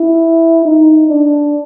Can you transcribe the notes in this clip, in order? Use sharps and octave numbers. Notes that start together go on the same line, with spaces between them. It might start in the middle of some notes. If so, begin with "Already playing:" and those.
Already playing: E4
D#4
D4